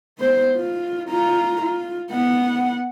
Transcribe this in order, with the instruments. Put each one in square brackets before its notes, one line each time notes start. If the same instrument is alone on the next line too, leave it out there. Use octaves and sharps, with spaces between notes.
[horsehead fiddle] B3 C5
F4
F4 A#5
F4
B3 F#5